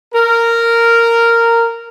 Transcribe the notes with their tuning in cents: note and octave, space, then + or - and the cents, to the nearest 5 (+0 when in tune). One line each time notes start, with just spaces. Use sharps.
A#4 -10